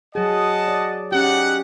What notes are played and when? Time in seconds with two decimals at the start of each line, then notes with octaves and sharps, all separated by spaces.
0.15 F#3 G#4 D#5 F#5 A5
0.68 D5
1.12 C#4 D#4 G4 F#5